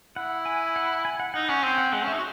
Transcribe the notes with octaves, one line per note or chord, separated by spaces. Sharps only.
E4 F#5
G#5
F#5
G#5
F#5
D#4 F#5
C#4 F#5
C4 G#5
F#5
G#3 F#5
C#4
E5
D#4
F#4